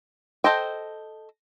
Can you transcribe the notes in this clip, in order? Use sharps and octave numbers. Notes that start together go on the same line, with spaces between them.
A4 C5 D#5 G5